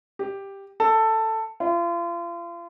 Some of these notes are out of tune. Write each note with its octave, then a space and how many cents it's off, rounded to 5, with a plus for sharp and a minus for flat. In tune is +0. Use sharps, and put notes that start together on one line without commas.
G4 +5
A4 +10
F4 -35